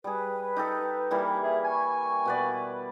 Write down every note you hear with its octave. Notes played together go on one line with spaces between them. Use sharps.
G3 G#4 B4
D#4 G4 A4
E3 G3 A#3
G#4 E5
G#5 C#6
B2 B4 D5